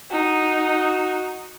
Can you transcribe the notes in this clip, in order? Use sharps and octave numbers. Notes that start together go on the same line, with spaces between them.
D#4 F#4